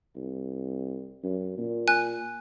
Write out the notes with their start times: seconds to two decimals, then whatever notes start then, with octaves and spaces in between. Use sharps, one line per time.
0.16 C2
1.23 F#2
1.58 A#2
1.88 G#5 F#6